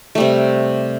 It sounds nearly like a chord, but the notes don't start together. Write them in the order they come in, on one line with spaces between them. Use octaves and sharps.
A3 G3 C3